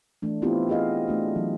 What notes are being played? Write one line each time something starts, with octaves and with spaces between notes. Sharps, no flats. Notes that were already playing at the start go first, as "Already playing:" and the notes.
E3 A3 D4
B3 C4 E4 F4 G4
F4 G#4 D#5 F5
A3 D4 F#4
E3 F#3